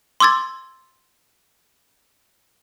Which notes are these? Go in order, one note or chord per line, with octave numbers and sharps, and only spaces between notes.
C6 D6 E6 G#6 A6